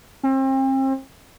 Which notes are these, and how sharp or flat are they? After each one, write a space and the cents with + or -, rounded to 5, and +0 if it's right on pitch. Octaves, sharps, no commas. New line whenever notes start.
C4 +35